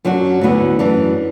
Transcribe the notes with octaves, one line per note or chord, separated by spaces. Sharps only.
F#2 F#3 D4 F#4
D2 D3 B3 E4
F#2 E3 D4